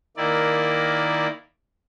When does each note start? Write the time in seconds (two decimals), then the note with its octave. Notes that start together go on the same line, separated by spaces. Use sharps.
0.17 D#3 A#3 E4 D5